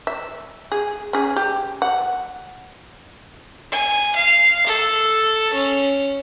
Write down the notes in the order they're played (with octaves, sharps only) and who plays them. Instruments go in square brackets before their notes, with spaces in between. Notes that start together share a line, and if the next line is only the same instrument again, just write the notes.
[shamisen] E5
G#4
C#4 G#4
G4
F#5
[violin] G#5
F5
A4
C#4